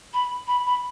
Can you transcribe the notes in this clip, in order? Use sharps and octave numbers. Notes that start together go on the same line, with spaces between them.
B5
B5
B5